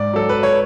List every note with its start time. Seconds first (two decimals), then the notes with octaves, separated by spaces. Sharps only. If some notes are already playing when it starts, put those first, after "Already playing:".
Already playing: G#2 D5
0.13 F#3 A4
0.29 B4
0.43 C#5